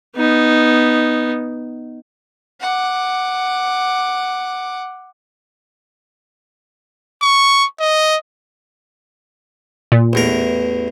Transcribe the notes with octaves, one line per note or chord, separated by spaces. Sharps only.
B3 D#4
F#5 D6
C#6
D#5
A#2
A1 E2 A#4